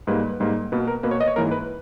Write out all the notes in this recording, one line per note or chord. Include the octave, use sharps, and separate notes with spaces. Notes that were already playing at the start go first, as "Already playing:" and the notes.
G#2 G3 A#3 B4
G#2 G3 A#3
B2 A#3 B4
A#4
B2 A#3 B4
C#5
D#5
C#5
G#2 E3 A#3 A#4
B4